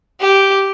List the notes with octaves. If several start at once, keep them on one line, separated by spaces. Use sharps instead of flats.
G4